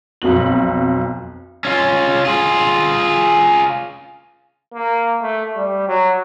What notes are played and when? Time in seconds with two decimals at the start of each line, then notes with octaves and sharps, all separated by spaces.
0.22 B1 F2 F#4 F#7
1.65 C#4 F4
2.25 F4 G#4
4.74 A#3
5.22 A3
5.56 G3
5.88 F#3